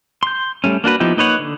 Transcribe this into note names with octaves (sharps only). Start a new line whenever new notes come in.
C6 G6
G3 A3 C#4
A#3 D4 F#4 B4
F3 B3 D#4 E4 G4
A#3 D#4 B4 C#5 F#5
D3